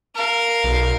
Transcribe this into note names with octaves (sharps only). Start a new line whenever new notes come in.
A#4 F5
B1